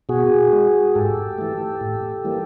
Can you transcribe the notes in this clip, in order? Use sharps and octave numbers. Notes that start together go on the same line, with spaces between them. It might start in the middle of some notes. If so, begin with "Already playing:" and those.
B2 F#4 G#4
G#3
G#2 G4 A4
E3 A3
A2
E3 G3 A#3